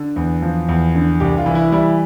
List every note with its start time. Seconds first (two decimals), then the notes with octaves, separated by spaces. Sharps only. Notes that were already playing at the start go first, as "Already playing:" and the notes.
Already playing: D3
0.16 E2
0.42 F3
0.69 E2
0.95 D3
1.20 C2 G4
1.38 F4
1.46 E3
1.55 E4
1.72 G3 E4